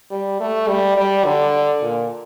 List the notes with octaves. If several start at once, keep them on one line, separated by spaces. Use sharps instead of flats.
G3
A3
G3
G3
D3
A#2